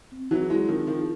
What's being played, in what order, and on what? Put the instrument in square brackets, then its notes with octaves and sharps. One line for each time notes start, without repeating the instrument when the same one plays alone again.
[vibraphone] C4
[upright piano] E3 F#3
[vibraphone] E4 G#4
[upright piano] F#3 G#3
[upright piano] D#3 F3 [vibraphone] C4
[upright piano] D#3 F3
[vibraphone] E4 G#4